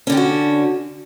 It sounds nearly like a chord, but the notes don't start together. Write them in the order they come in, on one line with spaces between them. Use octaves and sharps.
C#4 D3 G4 D4 F#4